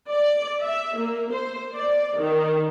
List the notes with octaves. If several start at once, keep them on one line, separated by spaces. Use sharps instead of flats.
D5
E5
A#3
C5
D5
D#3